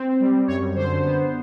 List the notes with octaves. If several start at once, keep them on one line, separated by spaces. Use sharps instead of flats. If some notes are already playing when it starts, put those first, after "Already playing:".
Already playing: C4
G3
F#2 C#5
D3 C5
B3